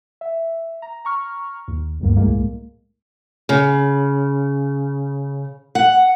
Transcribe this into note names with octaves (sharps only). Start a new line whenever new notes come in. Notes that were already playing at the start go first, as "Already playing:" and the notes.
E5
A#5
A#5 C#6 F6
D#2
G1 D2 G2 G3 A#3
C2 A2 G#3 A#3
C#3
F#5